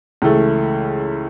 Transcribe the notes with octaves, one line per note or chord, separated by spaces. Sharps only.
C#2 C#3 E3 A3